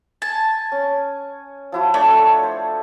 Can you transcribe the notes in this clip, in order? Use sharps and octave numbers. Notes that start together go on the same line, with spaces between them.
G#5 A5
C#4
F3 E4 F#4
A3 D4 C#5 A5
C5